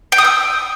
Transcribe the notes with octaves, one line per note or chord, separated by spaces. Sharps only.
G5
D#6
E6